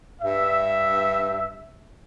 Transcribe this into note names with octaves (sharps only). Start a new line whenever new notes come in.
G2 E5